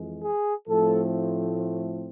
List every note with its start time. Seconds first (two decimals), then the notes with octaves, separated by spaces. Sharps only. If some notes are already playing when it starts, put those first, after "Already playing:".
Already playing: F2 E3 G#3
0.21 G#4
0.68 A2 F3 A3 C4 A4